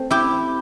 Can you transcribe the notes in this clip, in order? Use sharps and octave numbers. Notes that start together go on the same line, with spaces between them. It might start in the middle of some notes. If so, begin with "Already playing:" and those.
Already playing: A3 C4
E4 G4